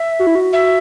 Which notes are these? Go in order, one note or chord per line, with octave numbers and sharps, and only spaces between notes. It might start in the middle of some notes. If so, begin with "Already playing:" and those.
Already playing: E5
F#4
E4
F#4
E5